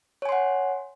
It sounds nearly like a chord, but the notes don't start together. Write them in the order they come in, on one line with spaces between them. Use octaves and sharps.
C#5 G#5 C6 F#5